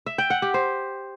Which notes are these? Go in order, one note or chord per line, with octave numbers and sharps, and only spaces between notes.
E5
G5
F#5
G4
C5